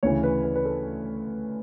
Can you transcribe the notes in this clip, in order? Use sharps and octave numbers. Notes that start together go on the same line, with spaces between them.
D2 C#3 E3 C#5
B4
B4
B4
A4